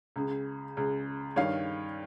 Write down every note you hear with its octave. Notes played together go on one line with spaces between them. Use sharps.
C#2 C#3
C#2 C#3
G2 D#3 C#5 F5